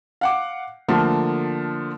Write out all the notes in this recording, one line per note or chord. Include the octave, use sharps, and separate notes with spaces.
F5 F#5 D6
D3 F3 A3 A#3